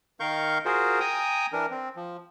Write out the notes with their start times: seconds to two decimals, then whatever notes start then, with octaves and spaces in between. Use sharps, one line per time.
0.20 D#3 A#4 F5 C#6 G6
0.65 F4 F#4 G#4 A#4 C5
1.00 G5 G#5 A#5 D#6
1.52 E3 D4 A#4
1.71 C4
1.96 F3